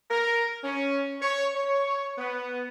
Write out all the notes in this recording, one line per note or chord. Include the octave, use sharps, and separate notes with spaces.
A#4
C#4
C#5
C#5
B3